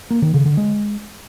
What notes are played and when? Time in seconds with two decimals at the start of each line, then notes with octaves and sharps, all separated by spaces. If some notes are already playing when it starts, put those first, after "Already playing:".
0.11 A#3
0.22 D#3
0.34 C#3
0.46 D3
0.57 G#3